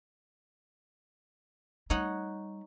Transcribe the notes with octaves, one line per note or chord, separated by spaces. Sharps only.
G3 A3 D#4 C#5 F#5